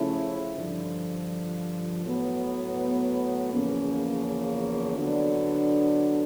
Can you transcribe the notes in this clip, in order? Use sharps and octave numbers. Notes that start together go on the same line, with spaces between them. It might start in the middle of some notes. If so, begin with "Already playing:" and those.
Already playing: C#3 F3 A3 C#4 E4
G2 D3 F3
A2 F#3 B3
E2 C#3 F3 A#3 C#4
D3 F#3 B3 D4